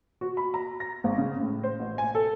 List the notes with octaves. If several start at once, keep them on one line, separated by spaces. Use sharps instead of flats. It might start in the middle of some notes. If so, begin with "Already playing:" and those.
F#4
B5
A#5
A#6
G#1
C#3
A2
C5
A1
G#5
A4